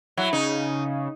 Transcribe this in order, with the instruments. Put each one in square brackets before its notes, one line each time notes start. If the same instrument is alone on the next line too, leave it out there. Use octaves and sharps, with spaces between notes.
[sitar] F#3 [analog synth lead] E4
[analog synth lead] C#3 [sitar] D#4